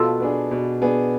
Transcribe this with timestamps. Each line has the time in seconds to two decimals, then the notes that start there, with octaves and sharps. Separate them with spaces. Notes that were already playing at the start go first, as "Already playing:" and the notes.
Already playing: B2 F4 A4
0.20 B3 D4 G#4
0.51 B2
0.82 B3 D4 G#4